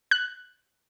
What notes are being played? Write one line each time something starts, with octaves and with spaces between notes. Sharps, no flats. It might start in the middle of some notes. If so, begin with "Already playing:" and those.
F#6